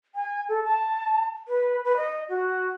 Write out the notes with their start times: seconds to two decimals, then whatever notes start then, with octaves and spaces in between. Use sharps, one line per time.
0.15 G#5
0.49 A4
0.64 A5
1.48 B4
1.84 B4
1.97 D#5
2.29 F#4